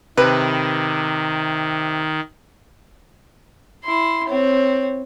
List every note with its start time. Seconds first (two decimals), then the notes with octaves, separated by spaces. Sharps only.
0.17 C3 D#3 B4
3.84 E4 C6
4.28 C4 C#5